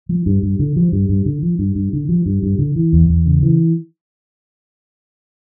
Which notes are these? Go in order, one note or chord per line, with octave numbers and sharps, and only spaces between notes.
F3
G2
G2
D3
F3
G2
G2
D3
F3
G2
G2
D3
F3
G2
G2
D3
E3
E2
E2
C#3
E3